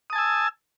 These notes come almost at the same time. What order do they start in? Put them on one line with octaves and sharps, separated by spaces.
D#6 A5 G#5 E6